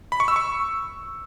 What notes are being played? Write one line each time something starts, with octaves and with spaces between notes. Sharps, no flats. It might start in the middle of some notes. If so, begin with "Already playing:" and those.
B5
C#6
E6
C#6